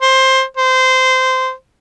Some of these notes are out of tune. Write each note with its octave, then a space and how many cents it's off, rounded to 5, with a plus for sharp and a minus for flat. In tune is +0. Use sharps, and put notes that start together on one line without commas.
C5 +15
C5 -15